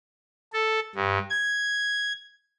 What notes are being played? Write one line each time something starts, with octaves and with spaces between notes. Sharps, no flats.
A4
G2
G#6